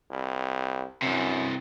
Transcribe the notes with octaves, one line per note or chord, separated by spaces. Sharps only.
C2
F#2 C3 E3